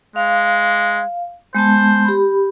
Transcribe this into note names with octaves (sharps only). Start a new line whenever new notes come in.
G#3 F5
G#3 B3 C5 A5
G4 B5